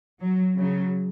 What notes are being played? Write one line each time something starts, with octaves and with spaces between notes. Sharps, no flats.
F#3
C#3 F#3